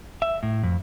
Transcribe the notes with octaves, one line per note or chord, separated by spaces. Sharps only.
E5
A2
F2